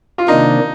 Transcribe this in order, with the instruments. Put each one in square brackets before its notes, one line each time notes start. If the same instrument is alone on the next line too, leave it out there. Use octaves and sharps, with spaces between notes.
[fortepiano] F4
[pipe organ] C3 D#3 A#3 D4 [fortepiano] D#4